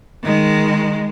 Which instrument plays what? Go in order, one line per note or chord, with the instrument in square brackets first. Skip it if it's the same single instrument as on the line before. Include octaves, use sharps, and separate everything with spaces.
[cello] D#3 G#3